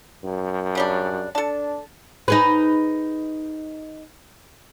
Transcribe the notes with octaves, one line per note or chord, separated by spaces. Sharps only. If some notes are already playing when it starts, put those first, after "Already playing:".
F#2
C#3 G3 D4
D4 A4 A5
D#4 G#4 B4